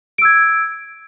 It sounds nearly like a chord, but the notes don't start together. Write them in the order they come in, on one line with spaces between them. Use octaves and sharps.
D7 E6 G#6